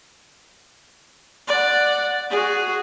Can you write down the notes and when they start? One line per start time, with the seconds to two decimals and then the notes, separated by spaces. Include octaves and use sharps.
1.48 D5 F#5
2.30 F#4 G#4